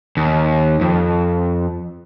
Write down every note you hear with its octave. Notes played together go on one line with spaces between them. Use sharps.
D#2
F2